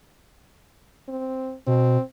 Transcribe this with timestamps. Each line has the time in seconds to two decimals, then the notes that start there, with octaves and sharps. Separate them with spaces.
1.08 C4
1.67 B2 C4